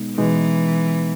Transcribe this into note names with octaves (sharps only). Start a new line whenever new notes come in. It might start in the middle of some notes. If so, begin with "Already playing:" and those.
Already playing: B2 G#3 B3 D#4
B2 E3 G#3 B3 D#4